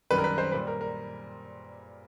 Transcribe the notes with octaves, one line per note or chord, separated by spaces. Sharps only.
F#2 D#3 G3 B4
A#4
B4
C5
A#2 G3 B4
A#4
A#4